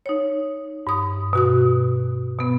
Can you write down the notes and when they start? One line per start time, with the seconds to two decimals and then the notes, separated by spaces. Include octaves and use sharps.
0.06 D#4 C#5
0.87 G2 D#6
1.33 B2 F#4 D#6
2.39 B2 B3